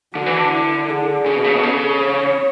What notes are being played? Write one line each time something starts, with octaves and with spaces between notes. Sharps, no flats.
D3 F#4
E3
D3
E4
G#4
C#3
B2
C#3
B2
C#3 A4
C#5